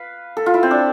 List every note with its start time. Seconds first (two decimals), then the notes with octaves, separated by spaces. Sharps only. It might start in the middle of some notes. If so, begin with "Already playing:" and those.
Already playing: B4 F5
0.37 A4
0.46 F4
0.54 E4
0.63 C4
0.71 D4